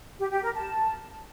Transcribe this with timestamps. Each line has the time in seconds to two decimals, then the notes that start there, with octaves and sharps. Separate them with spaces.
0.19 G4
0.31 G4
0.43 A#4
0.55 A5